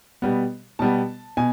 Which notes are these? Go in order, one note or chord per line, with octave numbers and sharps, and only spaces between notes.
B2 G3 B3
B2 G3 B3 A5
B2 G#5